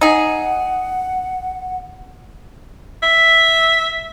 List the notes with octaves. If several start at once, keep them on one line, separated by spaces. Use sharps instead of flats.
D#4 G#4 F#5
E5